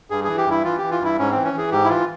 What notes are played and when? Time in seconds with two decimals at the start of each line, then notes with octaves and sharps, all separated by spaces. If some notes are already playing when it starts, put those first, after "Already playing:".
0.10 G2 G#4
0.24 E3 G#4
0.37 G4
0.46 G2 E4
0.64 E3 F4
0.78 E3 G4
0.91 F4
1.00 G2 E4
1.18 G#2 C#4
1.31 E3 C4
1.44 C#4
1.54 E3 G#4
1.71 G#2 G4
1.84 E4
1.89 E3 F4